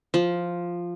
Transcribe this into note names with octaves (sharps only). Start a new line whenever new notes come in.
F3